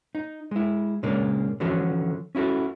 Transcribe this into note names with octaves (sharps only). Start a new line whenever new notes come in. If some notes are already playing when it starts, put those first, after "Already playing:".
D#4
G#3 E4
A#2 C#3 G#3 A#3 D4
D3 E3 F3 C#4 F#4 A4
C#4 E4 F#4 A4